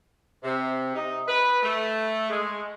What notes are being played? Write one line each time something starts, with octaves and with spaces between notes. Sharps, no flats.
C3
D#4
B4
A3
G#3